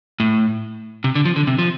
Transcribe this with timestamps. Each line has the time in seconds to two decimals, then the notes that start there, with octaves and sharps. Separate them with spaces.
0.20 A2
1.04 C3
1.15 D3
1.25 F3
1.36 D3
1.47 C3
1.59 F3